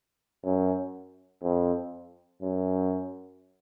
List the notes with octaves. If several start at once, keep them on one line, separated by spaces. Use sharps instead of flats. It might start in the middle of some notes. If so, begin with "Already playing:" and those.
F#2
F2
F#2